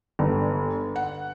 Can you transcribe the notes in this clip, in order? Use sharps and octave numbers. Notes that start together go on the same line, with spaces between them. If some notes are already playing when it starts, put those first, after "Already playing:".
G1
F#5